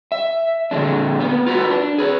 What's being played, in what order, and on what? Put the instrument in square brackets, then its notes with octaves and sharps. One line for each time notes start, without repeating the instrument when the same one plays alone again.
[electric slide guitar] E5
A#2 D3 F3 G#3 D4
A#3 B3
F4 F#4 A#4 B4
D4
G#4 B4